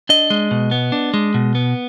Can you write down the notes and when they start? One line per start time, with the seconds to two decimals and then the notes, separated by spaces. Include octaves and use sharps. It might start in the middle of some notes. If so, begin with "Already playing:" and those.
0.09 D4 D#5
0.30 G#3
0.51 B2
0.71 B3
0.92 D4
1.14 G#3
1.34 B2
1.55 B3